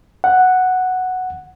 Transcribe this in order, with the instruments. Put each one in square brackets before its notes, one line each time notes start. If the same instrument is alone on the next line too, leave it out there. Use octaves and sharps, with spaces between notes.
[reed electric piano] F#5